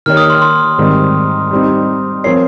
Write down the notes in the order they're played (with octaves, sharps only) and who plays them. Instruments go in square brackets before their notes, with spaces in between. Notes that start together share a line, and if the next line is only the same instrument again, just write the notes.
[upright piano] D#3 A#3 D#4 G4 C#5 [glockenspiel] F6
[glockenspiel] D#6
C6
C6
[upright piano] G#2 D#3 G3 C4
G3 C4 D#4
[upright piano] F3 C4 F4 A#4 C#5 [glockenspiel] C7